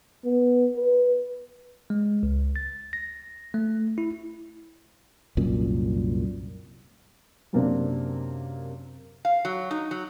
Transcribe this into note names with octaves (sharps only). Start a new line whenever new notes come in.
B3
B4
G#3
C#2
A6
A#6
A3
E4
C2 F#2 A#2
F#2 C3 A#3 C4 D4
F5
F#3
D#4
F#3